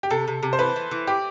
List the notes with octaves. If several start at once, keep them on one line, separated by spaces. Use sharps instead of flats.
G4
C3 A4
C3
C3
C5
E3 B4
E3
E3
G4 D5